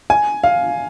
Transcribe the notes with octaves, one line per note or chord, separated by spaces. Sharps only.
G#5
F5